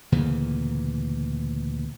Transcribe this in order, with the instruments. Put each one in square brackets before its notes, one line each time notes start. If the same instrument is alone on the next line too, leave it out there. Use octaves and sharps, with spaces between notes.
[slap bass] D2 A#2 C#3 E3